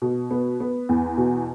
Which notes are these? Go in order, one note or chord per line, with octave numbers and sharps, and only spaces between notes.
B2
B3
B3
E2
B2